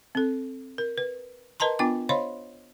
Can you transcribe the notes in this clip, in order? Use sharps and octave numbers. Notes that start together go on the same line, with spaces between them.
C4 A4
A#4
B4
A#4 B4 D#5 A5 A#5 C6
B3 D4 F4 G5 D6
C5 C#5 D#5 F5 B5 C6